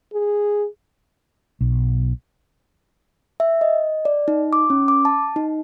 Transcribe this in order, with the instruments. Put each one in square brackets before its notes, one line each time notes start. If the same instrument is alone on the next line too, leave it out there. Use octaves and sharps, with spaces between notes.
[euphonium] G#4
[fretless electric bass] B1
[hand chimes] E5
D#5
D5
D#4
D6
C#4
D6
A5
D#4